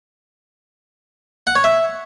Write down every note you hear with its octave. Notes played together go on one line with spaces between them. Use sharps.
F#5
C#5
E5